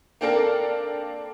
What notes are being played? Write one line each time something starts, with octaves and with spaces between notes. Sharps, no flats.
A#3 C4 D4 A4 A#4 F5